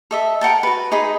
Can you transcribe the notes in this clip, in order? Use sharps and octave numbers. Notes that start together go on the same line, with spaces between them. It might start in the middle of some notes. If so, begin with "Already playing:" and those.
A4 D#5 E5
A#4 F#5 G5 A5
F#4 B4
D#4 G#4 D#5 B5